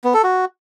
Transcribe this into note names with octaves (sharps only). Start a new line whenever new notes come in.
B3
A4
F#4